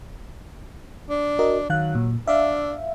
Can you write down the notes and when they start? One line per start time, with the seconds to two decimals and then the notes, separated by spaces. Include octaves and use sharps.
1.10 D4
1.39 F#4 A#4 D#5
1.70 D#3 F#3 F5 F#6
1.95 A#2
2.28 D4 E5 F5